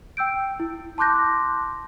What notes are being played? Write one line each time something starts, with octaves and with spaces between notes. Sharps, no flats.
G5 E6 G6 D7
E4
A5 C6 D6 F#6 G6 A#6